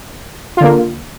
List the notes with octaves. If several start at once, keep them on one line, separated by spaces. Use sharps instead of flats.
D3 A#3 F4